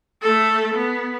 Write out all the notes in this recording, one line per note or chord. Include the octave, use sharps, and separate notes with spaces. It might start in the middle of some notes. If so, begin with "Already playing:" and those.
A3 A4
B3